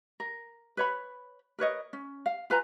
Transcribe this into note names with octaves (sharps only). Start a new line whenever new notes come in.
A#4
B4 C#5 B5
A#4 B4 C#5 D#5
C#4
F5
F4 B4 G#5 A#5